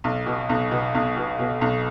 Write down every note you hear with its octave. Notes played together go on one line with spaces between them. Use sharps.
B1
B2
B1
B2
B1
B2
B2
B1